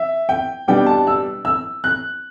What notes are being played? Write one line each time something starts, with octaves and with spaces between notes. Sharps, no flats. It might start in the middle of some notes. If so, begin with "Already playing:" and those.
Already playing: E5
G5
B2 G3 D4 G5
A5
E6
E6
F#6